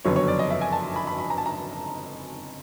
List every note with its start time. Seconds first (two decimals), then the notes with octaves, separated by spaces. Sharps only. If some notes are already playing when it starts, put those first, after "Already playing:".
0.05 F#1 F2 D3 F#3 B3 C#5
0.16 C#5
0.28 D5
0.39 D#5
0.50 E5
0.61 G#5
0.72 A5
0.96 B5
1.07 B5
1.19 B5
1.30 A#5
1.38 A5
1.46 A#5